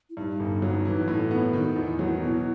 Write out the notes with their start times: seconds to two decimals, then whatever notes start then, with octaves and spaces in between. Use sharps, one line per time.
0.10 E4
0.17 G2 D#4
0.40 G1
0.62 F#3
0.85 E3
1.08 A2
1.31 B3
1.53 D#3 E4
1.61 F#4
1.69 E4
1.76 E2
1.99 F#3
2.22 B2